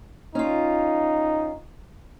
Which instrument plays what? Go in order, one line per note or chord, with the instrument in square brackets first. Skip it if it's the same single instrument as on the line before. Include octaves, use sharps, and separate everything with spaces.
[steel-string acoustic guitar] C#4 F4 [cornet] D#4